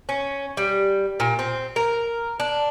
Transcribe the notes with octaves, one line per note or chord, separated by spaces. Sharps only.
C#4
G3
A#2
C4
A#4
D4